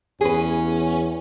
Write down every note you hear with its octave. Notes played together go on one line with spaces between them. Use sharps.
E2 C#4 G#4 B4